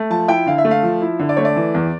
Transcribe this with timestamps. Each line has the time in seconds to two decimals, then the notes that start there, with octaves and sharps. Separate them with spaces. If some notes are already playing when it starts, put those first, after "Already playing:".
Already playing: A3
0.10 F3 A5
0.28 E4 G5
0.46 D3 F5
0.58 E5
0.65 A3
0.71 F5
0.83 F3
1.01 E4
1.19 D3
1.29 D5
1.37 A3 C#5
1.45 D5
1.56 E3
1.74 E2